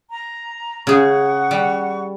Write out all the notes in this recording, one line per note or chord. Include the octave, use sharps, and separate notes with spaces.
A#5
C#3 G#4 F#5 C#6
G3